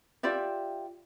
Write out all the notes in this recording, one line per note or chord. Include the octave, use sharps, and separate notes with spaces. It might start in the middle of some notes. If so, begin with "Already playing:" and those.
F4 G4 D5 E5